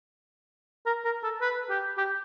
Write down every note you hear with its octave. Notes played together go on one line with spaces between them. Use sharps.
A#4
A#4
A4
B4
G4
G4